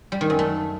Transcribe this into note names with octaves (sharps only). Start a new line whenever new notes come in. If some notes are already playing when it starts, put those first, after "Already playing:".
G3
D#3
F#2
A3